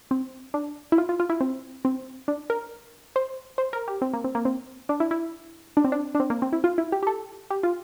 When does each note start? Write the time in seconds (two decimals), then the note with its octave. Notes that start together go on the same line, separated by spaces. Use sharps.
0.11 C4
0.54 D4
0.92 E4
0.98 F4
1.09 F4
1.20 F4
1.30 E4
1.40 C4
1.85 C4
2.28 D4
2.50 A#4
3.16 C5
3.58 C5
3.73 A#4
3.88 G4
4.02 C4
4.13 A#3
4.24 C4
4.35 A#3
4.45 C4
4.89 D4
5.00 E4
5.11 E4
5.77 D4
5.84 C4
5.92 D4
6.15 D4
6.20 C4
6.30 A#3
6.42 C4
6.53 E4
6.64 F4
6.78 E4
6.92 G4
7.03 G4
7.07 A4
7.50 G4
7.63 F4